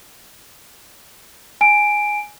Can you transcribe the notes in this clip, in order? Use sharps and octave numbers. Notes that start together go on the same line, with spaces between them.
G#5 D7